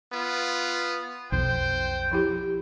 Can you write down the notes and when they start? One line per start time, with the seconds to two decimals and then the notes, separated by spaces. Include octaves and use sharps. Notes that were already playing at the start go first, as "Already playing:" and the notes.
0.13 B3 F4
1.32 B1 F2 C5 G5
2.11 F3 E4 G4